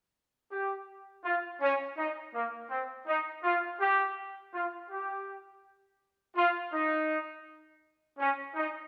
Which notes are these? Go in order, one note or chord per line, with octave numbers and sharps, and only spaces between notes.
G4
F4
C#4
D#4
A#3
C4
D#4
F4
G4
F4
G4
F4
D#4
C#4
D#4